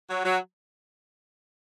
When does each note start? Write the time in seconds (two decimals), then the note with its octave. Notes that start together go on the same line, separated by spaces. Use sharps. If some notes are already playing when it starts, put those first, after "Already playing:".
0.10 F#3
0.24 F#3